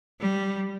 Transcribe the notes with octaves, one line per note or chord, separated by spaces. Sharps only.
G3